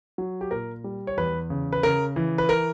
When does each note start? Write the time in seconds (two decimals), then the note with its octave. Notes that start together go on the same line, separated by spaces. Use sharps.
0.18 F#3
0.41 G4
0.51 A#2 A#4
0.84 G3
1.07 C#5
1.17 E2 B4
1.50 C#3
1.73 B4
1.83 C#3 A#4
2.16 E3
2.38 B4
2.49 A#4